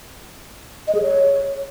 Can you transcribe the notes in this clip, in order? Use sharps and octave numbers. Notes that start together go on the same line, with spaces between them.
D#5
G#4
C#5